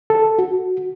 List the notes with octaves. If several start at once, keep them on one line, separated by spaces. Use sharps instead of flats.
A4
F#4